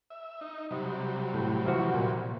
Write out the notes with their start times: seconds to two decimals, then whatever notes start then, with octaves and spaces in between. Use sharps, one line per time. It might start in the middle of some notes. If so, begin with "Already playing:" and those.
0.10 E5
0.41 D#4
0.71 C3 F#3 G3
1.34 A2
1.65 E3 F3 F#4
1.94 A#2